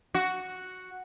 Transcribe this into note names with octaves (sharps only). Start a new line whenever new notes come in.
F#4